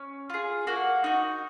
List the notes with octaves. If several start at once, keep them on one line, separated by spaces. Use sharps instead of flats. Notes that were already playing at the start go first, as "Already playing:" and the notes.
Already playing: C#4
F4 G#4
A#3 F#4 F#5
D#4 F#4